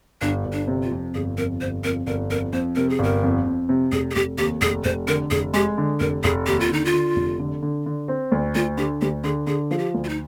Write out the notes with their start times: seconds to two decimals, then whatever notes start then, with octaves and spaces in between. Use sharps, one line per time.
0.22 G1 D4
0.46 G1
0.53 D4
0.67 C3
0.83 F4
0.92 F2
1.15 G1 G#4
1.38 F2 A#4
1.61 G1 C5
1.84 F2 A#4
2.07 G1 A#4
2.30 F2 A#4
2.53 F2 C5
2.76 C3 A#4
2.89 G#4
2.99 G1 A#4
3.23 F2
3.45 F2
3.69 C3
3.92 F1 G#4
4.11 G#4
4.15 F1 G4
4.38 D#2 G4
4.61 F1 G#4
4.84 F1 C5
5.08 D3 A#4
5.31 F1 G#4
5.53 G#3 G4
5.78 D3
6.00 F1 A#4
6.24 F1 G#4
6.47 D#2 G4
6.60 F4
6.69 D3 D#4
6.85 F4
6.94 D3
7.16 F1
7.39 D3
7.62 D3
7.86 D3
8.08 C4
8.32 D2
8.55 D2 F4
8.78 D3 G4
9.01 D2 G4
9.24 D3 G#4
9.47 D3 G#4
9.71 F3 G#4
9.78 G4
9.94 D2
10.04 F4
10.09 D#4